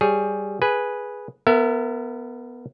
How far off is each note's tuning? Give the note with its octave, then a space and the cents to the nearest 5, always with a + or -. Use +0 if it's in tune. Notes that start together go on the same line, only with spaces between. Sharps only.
G3 +0 G#4 +0 C#5 +0
G#4 +0 B4 -5 G#5 +0
B3 +0 A#4 -30 E5 +25